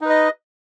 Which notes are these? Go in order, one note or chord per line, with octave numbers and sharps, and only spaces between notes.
D#4 B4 D#5